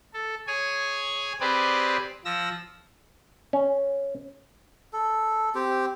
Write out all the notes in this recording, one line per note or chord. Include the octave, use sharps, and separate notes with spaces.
A4
G#4 C#5 G#5
C4 G4 G#4 B4 C5 D5
F3 E6 A#6
C#4
A4
C4 G4